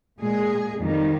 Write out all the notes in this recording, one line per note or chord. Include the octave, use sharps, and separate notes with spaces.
A#2 G#3 G#4
F2 D#3 G3